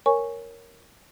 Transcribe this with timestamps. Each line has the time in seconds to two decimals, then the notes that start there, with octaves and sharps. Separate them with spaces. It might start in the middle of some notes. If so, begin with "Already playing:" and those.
0.06 A#4 C#5 G#5 C#6